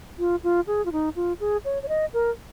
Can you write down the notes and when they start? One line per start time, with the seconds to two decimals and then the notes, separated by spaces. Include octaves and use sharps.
0.19 F4
0.44 F4
0.67 G#4
0.86 F4
0.92 D#4
1.16 F4
1.40 G#4
1.65 C#5
1.83 C#5
1.89 D#5
2.14 A#4